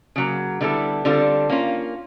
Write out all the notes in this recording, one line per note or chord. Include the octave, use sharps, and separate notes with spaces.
C#3 F#3 A#3
D3 G3 B3 E4 A4
D3 G3 C4 F4 A4
A#3 C#4 F4